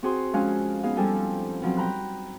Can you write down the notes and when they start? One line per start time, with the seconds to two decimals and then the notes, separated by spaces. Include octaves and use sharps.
0.03 C4 F#4 G#4 C5 C6
0.33 F2 G#3 C#4 F5 G#5 F#6
0.83 B3 D#4 G#4 F5
0.97 F2 F3 G3 A4 G5 G#5
1.62 B2 F3 F#3 C4
1.77 G5 A#5 B5 F#6